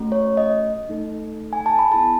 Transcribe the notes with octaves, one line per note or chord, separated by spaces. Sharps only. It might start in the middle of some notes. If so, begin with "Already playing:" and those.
Already playing: A3 C#4 F#4
C#5
D#5
A3 D#4 A4
G#5
A5
B5
B3 E4 G#4 A5